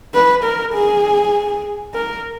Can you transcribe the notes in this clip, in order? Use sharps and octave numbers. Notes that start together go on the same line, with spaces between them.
B4
A#4
G#4
A#4